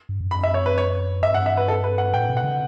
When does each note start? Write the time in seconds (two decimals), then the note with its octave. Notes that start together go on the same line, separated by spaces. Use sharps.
0.09 G2
0.20 F#2
0.31 B5
0.43 E5
0.54 C#5
0.66 B4
0.78 C#5
1.22 G2 E5
1.34 F#5
1.46 E5
1.57 B4
1.68 A4
1.84 B4
1.98 F#5
2.14 A2 G5
2.30 B2
2.37 F#5
2.44 C#3